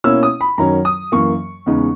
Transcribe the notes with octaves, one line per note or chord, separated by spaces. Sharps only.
B2 A#3 C#4 E4 E6
D#6
B5
F#2 D#3 F#3 C#4 A#5
D#6
F#2 E3 A#3 C#6
E2 C#3 G#3 B3 D#4